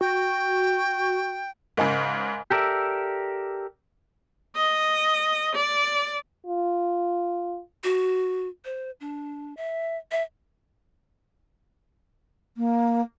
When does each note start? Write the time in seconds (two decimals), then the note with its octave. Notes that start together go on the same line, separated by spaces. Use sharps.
0.01 F#4 G5
1.77 G#2 C#3 A#4 D#5 G#5
2.50 G4 A4 A#4 D5 E5
4.56 D#5
5.56 D5
6.46 F4
7.84 F#4
8.65 C5
9.01 D4
9.57 E5
10.12 E5
12.57 A#3